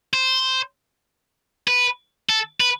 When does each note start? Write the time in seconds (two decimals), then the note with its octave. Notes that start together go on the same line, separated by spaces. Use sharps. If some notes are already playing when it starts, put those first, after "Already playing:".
0.13 C5
1.68 B4
2.29 A4
2.60 B4